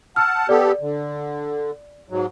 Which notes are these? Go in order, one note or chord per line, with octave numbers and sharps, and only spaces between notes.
F#5 A5 E6 F6
B3 G4 A4 D5
D3
G#2 F#3